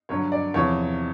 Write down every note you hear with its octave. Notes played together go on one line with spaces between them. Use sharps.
G2 D3 F#3 C#5
D5
E2 C3 F3 C#5